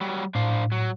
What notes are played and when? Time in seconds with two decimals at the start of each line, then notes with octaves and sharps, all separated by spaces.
0.01 F#3 G3
0.35 A2 D4 C5 F5
0.72 F#3